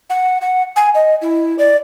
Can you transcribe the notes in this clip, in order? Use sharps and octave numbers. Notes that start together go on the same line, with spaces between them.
F#5
F#5
G#5
D#5
E4
D5